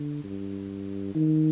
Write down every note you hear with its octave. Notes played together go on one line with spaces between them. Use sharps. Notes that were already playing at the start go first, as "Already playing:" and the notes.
Already playing: D3
G2
D#3